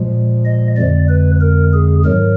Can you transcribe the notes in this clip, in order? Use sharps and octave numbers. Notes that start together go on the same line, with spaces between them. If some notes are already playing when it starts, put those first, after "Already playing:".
Already playing: A#2 F3 G#3
D#5
F2 D3 G#3 D5
B4
A#4
G#4
G#2 D#3 F#3 A#4